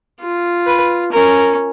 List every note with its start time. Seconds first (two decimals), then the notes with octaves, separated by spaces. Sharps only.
0.21 F4
0.67 B4
1.13 C#4 A#4